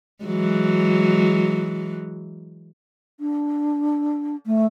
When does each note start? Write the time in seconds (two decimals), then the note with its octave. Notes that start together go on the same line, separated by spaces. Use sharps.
0.24 E3 F#3 G#3
3.20 D4
4.46 A3